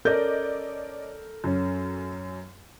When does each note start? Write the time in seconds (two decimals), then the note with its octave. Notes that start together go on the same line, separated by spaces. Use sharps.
0.05 C#4 A4 A#4 D5 D#5 G6
1.44 F#2 C#4